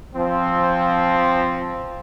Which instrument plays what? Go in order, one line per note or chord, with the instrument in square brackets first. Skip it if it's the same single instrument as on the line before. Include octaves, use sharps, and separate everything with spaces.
[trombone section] F3 C4